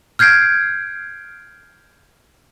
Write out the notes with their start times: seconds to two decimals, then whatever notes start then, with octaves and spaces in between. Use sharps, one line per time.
0.19 F6 G6 G#6 C7 D7